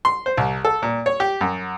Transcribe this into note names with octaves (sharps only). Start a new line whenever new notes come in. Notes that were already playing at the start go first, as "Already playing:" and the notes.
C6
C5
C2
A4
A#2
C#5
G4
F#2